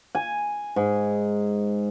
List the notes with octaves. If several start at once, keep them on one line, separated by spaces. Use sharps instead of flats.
G#5
G#2